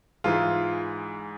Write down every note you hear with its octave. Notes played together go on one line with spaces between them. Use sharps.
G#2 E3 G#3 F4